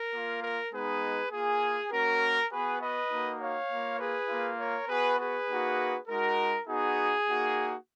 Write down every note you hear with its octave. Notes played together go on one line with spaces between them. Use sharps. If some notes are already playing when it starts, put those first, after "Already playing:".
Already playing: A#4
A#3 F4
A#4
G#3 B3 D#4 G#4 B4
A#3 F4 G#4
A#3 C#4 F#4 A#4
B3 F#4 G#4 B4
B4 D#5
A#3 D#4 F#4
C#5 F5
A#3 F4
G#4 B4
A#3 F4
A#4 C#5
B3 F#4 G#4 B4
G#4 B4
A#3 D#4 F#4
G#3 D#4 F#4 A#4
B3 D#4 F#4 G#4
A#3 D#4 F#4